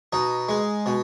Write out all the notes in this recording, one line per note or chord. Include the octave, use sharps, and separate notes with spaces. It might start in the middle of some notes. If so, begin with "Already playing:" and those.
B2 D#4
G#3
B2